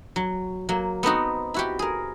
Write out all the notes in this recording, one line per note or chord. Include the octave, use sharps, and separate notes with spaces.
F#3
F#3 A#3
B3 C4 D#4 F#4
E4 F#4 G4
G#4 A#4